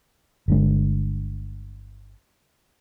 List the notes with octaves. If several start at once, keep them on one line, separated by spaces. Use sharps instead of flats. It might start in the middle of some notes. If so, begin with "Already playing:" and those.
G1 D3 G#3